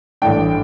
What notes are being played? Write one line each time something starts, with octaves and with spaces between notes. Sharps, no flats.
A1 G2 E3 A3 D4 G5